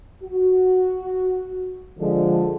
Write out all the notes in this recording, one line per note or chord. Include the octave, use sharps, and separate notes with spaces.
F#4
D3 F3 G#3